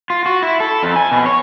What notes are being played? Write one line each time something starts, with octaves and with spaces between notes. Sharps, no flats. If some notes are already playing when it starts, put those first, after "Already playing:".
F4
F#4
E4
A4
F2
G#5
B2
C#5